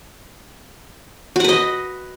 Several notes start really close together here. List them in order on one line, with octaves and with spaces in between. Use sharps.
F#4 F#5 B4 D#5